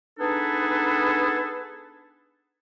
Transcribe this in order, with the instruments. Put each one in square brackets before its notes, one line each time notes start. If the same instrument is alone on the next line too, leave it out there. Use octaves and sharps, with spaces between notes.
[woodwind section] B3 D4 D#4 G#4 A4 B4